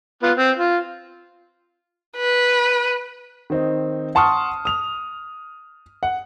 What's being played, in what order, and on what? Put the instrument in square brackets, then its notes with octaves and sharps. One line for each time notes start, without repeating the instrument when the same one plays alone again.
[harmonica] B3 F4
C4
F4
[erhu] B4
[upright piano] D#3 C4 D#4
F#5 A5 C6 C#6 D#6 F6
D#6 F7
F#5